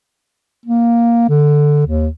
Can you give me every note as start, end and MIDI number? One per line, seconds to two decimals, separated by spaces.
0.66 1.28 58
1.29 1.82 50
1.86 2.08 39